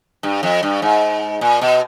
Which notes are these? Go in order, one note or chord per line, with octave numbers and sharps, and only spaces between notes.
G2
F2
G2
G#2
A#2
B2